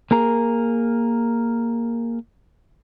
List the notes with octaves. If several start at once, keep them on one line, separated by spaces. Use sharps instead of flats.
A#3 G#4 A#4